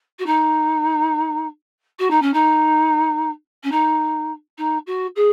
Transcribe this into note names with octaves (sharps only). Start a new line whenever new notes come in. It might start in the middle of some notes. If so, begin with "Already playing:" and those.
F#4
D#4
F#4
D#4
C#4
D#4
C#4
D#4
D#4
F#4
G#4